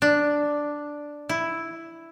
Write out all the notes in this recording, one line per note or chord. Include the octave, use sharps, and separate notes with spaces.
D4
E4